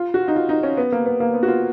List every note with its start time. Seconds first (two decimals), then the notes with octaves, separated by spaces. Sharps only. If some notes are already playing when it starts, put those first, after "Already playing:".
Already playing: F4
0.14 F#4
0.28 D#4
0.36 F4
0.49 D#4
0.63 C#4
0.77 B3
0.92 A#3
1.06 B3
1.20 A#3
1.34 B3
1.43 F#4
1.48 F4